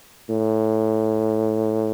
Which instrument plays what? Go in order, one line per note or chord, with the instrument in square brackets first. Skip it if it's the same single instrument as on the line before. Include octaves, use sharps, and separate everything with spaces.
[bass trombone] A2